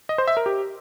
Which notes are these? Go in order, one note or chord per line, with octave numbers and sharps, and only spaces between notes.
D#5
C5
E5
A#4
G4